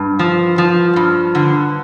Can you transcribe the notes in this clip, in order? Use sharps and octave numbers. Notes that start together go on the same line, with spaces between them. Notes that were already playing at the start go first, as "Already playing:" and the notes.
Already playing: G2
F3
F3
G2
D3